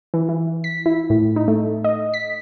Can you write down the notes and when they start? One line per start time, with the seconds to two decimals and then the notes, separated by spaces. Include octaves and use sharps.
0.14 E3
0.29 E3
0.64 B6
0.86 E4
1.10 A2
1.36 D#4
1.48 A3
1.84 D#5
2.14 B6